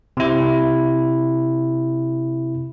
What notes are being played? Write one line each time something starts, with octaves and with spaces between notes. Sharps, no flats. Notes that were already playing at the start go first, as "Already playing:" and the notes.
C3 E4